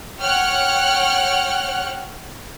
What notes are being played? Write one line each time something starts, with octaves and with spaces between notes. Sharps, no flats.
C#5 F#5 G5 F6 F#6